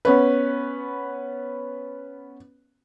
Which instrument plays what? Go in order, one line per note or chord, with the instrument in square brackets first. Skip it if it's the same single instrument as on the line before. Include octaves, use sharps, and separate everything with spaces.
[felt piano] B3 C#4 B4